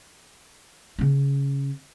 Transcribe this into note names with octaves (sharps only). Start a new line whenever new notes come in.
C#3 C#4